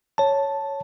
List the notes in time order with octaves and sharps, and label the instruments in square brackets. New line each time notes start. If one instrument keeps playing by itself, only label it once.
[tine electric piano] C#5 A5